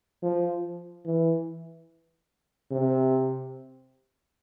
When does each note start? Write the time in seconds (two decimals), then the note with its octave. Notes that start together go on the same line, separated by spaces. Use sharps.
0.23 F3
1.06 E3
2.71 C3